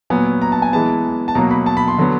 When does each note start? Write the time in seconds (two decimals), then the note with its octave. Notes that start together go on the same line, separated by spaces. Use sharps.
0.10 A#2 F#3 B3 G#5
0.41 A#5
0.52 A5
0.62 G#5
0.73 E3 G#3 B3 A5
1.28 A5
1.35 B2 F#3 A#3 A#5
1.51 B5
1.66 A5
1.77 B5
1.88 C6
1.98 D3 F#3 B3